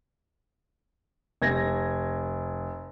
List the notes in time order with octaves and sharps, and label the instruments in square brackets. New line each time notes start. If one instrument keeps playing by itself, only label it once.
[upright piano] F1 G#6 A#6